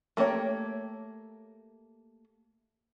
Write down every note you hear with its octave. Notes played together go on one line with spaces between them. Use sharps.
A3 A#3 G4 C#5 G5